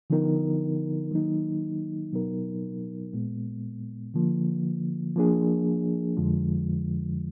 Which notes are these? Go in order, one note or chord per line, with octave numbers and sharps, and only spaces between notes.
D3 F3 B3 D#4 A#4
D#3 F#3 A#3 D#4
B2 F#3 B3 D#4 A#4
A#2 G#3 B3
D3 F3 A#3
F3 A#3 D4 G#4
F2 D3 F3 G#3